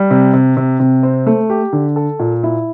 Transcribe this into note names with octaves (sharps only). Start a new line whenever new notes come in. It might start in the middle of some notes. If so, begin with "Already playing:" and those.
Already playing: G3
C3
C3
C3
C3
C4
A3
G4
D3
A4
A#2
E4